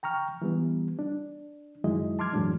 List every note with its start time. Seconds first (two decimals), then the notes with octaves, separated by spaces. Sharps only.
0.03 G5 A#5 C#6 F6
0.42 E3 G3 B3
0.99 D4
1.84 F#2 D#3 F#3 G#3 E4 D#5
2.19 A5 C6 D6 F6 G#6
2.33 F#2 A2 E3 F#3 G#3 D4